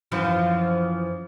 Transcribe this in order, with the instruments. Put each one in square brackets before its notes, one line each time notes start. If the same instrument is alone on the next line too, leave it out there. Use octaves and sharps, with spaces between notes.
[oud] F#2 E3 F3